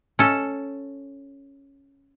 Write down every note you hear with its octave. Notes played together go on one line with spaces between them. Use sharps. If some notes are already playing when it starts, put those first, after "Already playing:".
C#4 A4